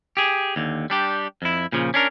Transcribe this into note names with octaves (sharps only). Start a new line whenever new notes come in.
G4 G#4
D#2 D3
G3 D4 G4
F2 E4
A#2 C#3 F3
C#4 D4 A#4